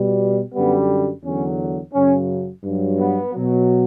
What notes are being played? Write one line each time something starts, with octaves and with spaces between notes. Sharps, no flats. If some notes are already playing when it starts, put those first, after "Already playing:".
Already playing: B2 G3
F#2 D3 G3 B3
E2 D3 F#3 C#4
F#2 C#3 F#3 C#4
G2 F#3
B3
B2 F#3